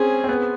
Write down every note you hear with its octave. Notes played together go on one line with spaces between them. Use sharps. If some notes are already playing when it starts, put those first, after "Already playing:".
Already playing: C4 C#4 G#4
C4
B3